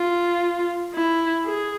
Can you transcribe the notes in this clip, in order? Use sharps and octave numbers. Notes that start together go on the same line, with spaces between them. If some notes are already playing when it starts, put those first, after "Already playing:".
Already playing: F4
E4
G#4